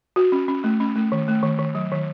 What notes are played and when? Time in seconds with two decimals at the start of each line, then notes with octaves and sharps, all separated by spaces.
0.16 F#4
0.32 C#4
0.48 C#4
0.64 A3
0.80 C#4
0.96 A3
1.12 D#3
1.28 A3
1.43 D#3
1.59 D#3
1.75 F#3
1.91 D#3